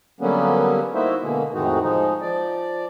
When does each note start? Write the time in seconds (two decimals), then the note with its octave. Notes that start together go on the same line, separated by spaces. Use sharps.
0.21 D3 F#3 G3 A#3 B3 C#4
0.95 A#3 D#4 E4 F#4 C5 E5
1.22 B2 D3 G#3 A#3
1.54 F2 A2 D#3 G#3 D#4 F#4
1.82 F3 G#3 D#4
2.21 F3 D5